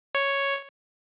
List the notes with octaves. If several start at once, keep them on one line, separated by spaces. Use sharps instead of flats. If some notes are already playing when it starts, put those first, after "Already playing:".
C#5